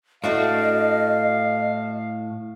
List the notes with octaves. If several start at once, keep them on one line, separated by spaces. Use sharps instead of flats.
A2 A3 D4 F#4 D#5 F5